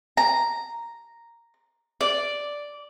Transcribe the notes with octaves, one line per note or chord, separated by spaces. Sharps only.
A#5
D5